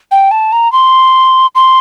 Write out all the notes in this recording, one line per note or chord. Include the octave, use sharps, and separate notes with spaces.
G5
A5
A#5
C6
C6